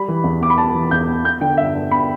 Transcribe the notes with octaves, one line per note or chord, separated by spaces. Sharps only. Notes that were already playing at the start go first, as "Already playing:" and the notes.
Already playing: G3 B5
E3
E2
B3 D6
B5
G3 A5
E3
E2 G6
B3
B3 G6
D3 G5
G2 E5
G2
B3 B5